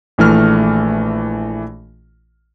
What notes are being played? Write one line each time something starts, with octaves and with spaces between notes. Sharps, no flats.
A#1 E3 A3 F6